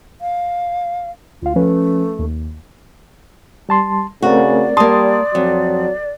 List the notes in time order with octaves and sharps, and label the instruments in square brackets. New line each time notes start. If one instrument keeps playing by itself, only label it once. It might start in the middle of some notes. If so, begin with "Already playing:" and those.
[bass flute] F5
[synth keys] D2 F5 [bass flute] F4
[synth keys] F3 C#4 B4 [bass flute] A3
[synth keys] D#2
[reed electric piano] G3 A5 C6
[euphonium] C#3 [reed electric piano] A3 C4 A#4 [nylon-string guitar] F#4 [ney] D5
[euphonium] G3 [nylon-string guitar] A#3 A5 [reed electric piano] C6 D#6
[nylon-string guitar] F2 [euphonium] F#3